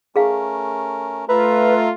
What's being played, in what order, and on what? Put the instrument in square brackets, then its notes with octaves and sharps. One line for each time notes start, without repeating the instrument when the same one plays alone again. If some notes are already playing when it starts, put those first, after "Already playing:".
[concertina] A3 C#4 A#4 [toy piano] G#4 F5
[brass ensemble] A3 F4 [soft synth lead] B4 [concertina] E5 A#5